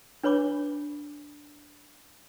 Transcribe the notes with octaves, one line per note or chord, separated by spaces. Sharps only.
D4 B4 C#5 B5 D6